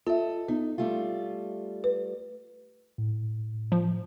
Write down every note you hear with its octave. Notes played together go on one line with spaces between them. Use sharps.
F4 A4 D#5 E5
B3 D#4
G3 A3 F4
B4
A2
F3